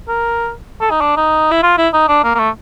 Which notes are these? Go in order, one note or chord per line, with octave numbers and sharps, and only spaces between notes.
A#4
A4
D#4
D4
D#4
E4
F4
E4
D#4
D4
A#3
A#3
A3